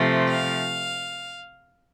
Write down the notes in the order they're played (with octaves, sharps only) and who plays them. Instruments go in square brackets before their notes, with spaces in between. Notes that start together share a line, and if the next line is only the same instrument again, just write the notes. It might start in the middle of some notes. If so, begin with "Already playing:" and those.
Already playing: [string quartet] C3 F3 A3
F5